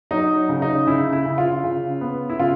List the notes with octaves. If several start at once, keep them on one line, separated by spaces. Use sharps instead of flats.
F#3 D#4
C#3
D#4
C#3 E4
E4
C#3
F4
C#3
B3
E4
C#3 F4